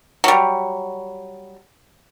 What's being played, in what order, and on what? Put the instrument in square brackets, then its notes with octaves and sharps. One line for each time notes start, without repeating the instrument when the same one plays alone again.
[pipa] F#3 G3